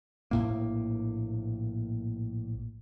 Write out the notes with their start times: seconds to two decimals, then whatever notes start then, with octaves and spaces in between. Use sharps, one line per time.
0.31 A#1 A2 A#3